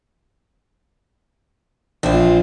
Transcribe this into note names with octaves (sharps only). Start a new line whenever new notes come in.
A#1 C4 F4